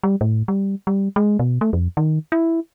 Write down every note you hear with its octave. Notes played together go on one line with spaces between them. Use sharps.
G3
A2
G3
G3
G#3
B2
A3
F2
D#3
E4